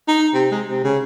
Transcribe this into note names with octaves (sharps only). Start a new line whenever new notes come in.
D#4
C3
G#3
C3
C#3